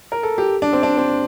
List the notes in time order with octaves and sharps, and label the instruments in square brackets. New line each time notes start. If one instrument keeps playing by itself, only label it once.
[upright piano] A#4
A4
G4
D4
C4
D4
C4